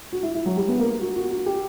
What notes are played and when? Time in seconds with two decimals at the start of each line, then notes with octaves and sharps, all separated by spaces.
0.12 F#4
0.23 E4
0.35 E4
0.46 F#3
0.57 G3
0.68 B3
0.79 A#3
1.01 F#4
1.16 F#4
1.31 F#4
1.46 G4